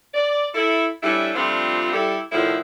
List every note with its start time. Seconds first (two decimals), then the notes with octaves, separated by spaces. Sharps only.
0.14 D5
0.54 E4 A4
1.03 G3 A3 C#4 D4 E4
1.34 F3 G3 A3 C4 D4 F4
1.93 G3 E4 G4 A4
2.32 A2 D3 D#3 F3 E4